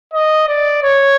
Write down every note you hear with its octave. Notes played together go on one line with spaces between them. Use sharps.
D#5
D5
C#5